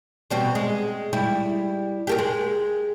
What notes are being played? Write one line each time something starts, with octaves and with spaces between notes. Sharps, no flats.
B2 G3 C4
G#3
G3 E4
G4 A4 A#4
G#3